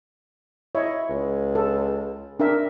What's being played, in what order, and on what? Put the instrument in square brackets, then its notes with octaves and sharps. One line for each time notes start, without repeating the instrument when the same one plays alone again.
[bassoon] E4 [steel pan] C#5 D#5
[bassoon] C#2
[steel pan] A4
D4 A#4 E5